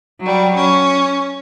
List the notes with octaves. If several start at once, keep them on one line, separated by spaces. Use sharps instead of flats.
F#3 G3
C#4